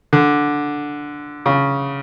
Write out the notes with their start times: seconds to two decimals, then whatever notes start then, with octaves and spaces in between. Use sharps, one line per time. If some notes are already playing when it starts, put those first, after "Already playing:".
0.13 D3
1.46 C#3